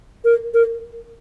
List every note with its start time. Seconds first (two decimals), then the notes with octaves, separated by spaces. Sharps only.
0.25 A#4
0.54 A#4